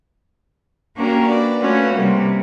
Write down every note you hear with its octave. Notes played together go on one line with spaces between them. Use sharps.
A#3 C#4 D4 F#4 G4 A#4
B4 D5
A3 C#4 F4 F#4 B4
C3 G3 A#3